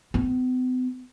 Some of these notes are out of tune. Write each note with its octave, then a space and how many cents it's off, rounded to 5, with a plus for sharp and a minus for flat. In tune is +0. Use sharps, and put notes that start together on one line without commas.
B3 +45